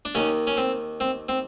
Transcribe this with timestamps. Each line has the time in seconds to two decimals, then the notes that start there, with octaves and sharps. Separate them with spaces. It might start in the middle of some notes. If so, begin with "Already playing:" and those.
0.05 D4
0.15 D#2 D#3 C#4
0.47 C#4
0.57 C4
1.00 C4
1.29 C4